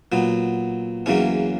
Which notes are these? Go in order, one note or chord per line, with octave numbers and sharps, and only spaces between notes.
A#2 F#3 B3
E2 C#3 F#3 A#3 C#4